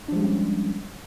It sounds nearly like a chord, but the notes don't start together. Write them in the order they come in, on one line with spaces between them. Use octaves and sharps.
D4 F3 G#3 G3 C#4